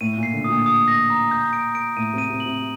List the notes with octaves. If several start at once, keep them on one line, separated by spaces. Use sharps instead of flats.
A2 D#7
A#2
C7
D3
A#2 D#6
D#6
A#6
A#5
G6
D7
D7
A2 D#7
C3 D#7
C3
F#7
C3